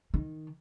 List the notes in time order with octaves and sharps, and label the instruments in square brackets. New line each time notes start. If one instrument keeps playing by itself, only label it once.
[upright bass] D#3